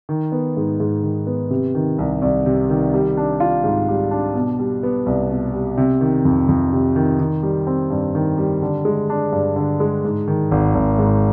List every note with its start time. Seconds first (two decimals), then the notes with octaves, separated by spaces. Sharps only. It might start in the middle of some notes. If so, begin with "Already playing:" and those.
0.09 D#3
0.32 B3
0.57 G#2
0.80 G#2
1.04 D#3
1.27 B3
1.50 C3
1.75 D#3
1.98 C2
2.22 C2
2.46 C3
2.70 D#3
2.94 G3
3.17 D4
3.40 F4
3.64 G#2
3.88 G3
4.11 D4
4.35 B2
4.59 G3
4.83 B3
5.06 C2
5.30 B2
5.53 G3
5.77 C3
6.01 D#3
6.25 F2
6.49 F2
6.73 C3
6.96 D#3
7.20 D#3
7.43 G3
7.67 C4
7.90 G2
8.15 D#3
8.38 G3
8.62 D3
8.85 G#3
9.10 D4
9.32 G2
9.56 D3
9.80 G#3
10.04 G#2
10.28 D#3
10.51 G#1
10.75 G#1
10.99 G#2